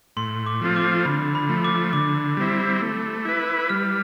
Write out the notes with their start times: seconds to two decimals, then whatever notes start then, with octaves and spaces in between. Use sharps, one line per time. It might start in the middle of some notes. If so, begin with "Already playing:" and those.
0.17 A2 C6
0.46 D6
0.61 F3 A3 C4 F4
0.76 D6
1.05 D3 B5
1.35 B5
1.49 F3 A3
1.65 D6
1.93 D3 D6
2.37 G3 C4 E4
2.82 A3
3.25 E4 B4
3.69 G3 F6